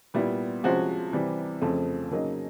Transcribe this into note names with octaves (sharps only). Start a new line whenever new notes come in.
A#2 G3 B3 E4
C3 F3 G#3 C#4 F#4
C3 E3 G3
F2 C#3 F3 A3 C4
C#3 F#3 A#3 D#4